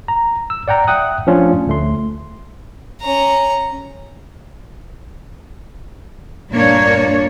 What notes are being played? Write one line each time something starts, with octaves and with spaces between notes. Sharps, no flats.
A#5
E6
D5 F#5 G5 A#5
E5 F#5 G5 D#6 F#6
F3 A3 C#4 D4 F4
D2 A3 C6
C#4 A#5
G2 A#2 A#3 D4 C#5